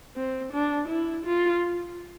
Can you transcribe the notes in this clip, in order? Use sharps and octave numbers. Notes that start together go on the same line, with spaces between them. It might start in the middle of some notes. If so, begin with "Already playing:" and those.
C4
D4
E4
F4